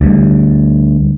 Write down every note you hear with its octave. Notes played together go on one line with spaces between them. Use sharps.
D2 G3